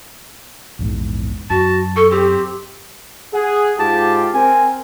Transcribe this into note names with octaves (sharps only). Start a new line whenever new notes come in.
A#1 E2 G#2
F#2 F#4 A5
A4 C#6
C4 G4
G#4 F#5
G#2 F4 G4 A5
C4 A#4 G#5